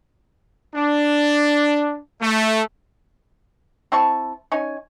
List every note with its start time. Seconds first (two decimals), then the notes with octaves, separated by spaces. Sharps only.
0.75 D4
2.21 A3
3.92 C4 E4 A5 C#6
4.52 C#4 D#4 C#5 G#5